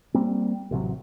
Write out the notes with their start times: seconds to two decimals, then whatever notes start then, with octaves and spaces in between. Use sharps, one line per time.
0.14 G3 A#3 C4
0.71 A1 C3 E3 F#3